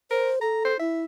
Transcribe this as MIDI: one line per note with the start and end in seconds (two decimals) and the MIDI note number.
0.11 0.30 70
0.11 0.39 72
0.41 0.77 69
0.41 0.63 82
0.65 0.78 72
0.79 1.04 64
0.79 1.04 76